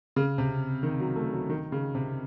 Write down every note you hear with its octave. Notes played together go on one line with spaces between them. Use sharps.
C#3
C3
D#3
F#3
A3
F#3
D#3
C#3
C3